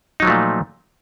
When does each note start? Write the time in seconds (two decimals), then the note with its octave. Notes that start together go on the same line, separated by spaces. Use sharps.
0.20 D#4
0.22 F#3
0.25 F3
0.27 A3
0.30 A#2